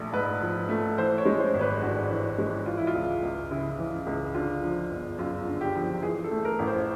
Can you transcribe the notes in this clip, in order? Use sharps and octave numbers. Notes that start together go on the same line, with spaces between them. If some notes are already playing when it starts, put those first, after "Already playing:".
Already playing: A#1 A3
G#2 B4
F3
A3
E3 C5
C#5
G#3
C5
G#1
B4
G2 F#4
E3
G#3
E3 F4
E4
F4
C#2
C#2
C#3 E4
E3
C#2
D3 F4
F3
G1
F#2 F4
D3
G4
F3
E3 G#4
A4
A3
A#4
A1
C5